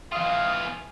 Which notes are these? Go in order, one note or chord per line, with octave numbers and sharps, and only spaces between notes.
E3 F4 F5 D#6
G#5